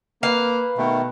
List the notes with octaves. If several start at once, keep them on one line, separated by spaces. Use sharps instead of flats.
A#3 B4 F5
B2 D#3 A3